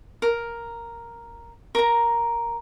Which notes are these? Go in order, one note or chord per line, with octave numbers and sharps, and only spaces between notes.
A#4
A#4 A#5